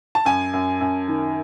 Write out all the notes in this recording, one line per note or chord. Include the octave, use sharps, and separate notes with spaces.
A5
F#2 G#5
F#2
F#2
D#3